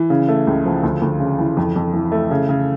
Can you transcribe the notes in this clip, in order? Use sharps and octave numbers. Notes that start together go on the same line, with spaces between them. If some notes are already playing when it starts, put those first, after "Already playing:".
Already playing: E3
C#3
A3
C#2
F3
D2
D2
C#3
E3
F2
F2
E3
A3
C#3
C#3